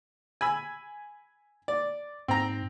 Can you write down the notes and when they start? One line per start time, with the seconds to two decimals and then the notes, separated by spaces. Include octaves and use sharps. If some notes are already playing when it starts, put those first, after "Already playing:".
0.41 G#5 B5 E6
1.68 D5
2.28 G#2 C4 A#5